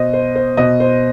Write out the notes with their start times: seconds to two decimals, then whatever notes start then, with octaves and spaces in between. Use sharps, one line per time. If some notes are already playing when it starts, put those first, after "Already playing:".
Already playing: B2 C5 D#5
0.13 C5
0.35 C5
0.57 B2 D#5
0.80 C5